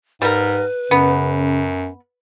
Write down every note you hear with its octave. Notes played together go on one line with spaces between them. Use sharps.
G#2 G3 A#4 B4
F#2 C#3 B3